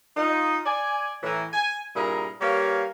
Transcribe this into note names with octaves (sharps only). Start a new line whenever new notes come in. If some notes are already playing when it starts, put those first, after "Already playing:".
D#4 F4
D5 G#5
A2 E3 A#5
G#5
G2 A#2 E4 G#4 A#4 A#5
G3 A#3 G4 B4 C#5 F5